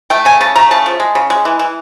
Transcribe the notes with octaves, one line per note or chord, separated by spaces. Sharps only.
A3 G5
C#3 G#5
C#3 A5
A3 A#5
C#3 A5
F3
G#3
C#3
G#3
E3
E3